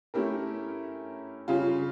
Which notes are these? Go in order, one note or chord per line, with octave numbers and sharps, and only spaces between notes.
A3 C#4 E4 G4 A#4
C#3 G3 C#4 F4